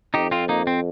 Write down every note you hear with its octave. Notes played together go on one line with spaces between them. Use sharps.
F2 D#4 G4
C4 F4
A#3 D#4
C4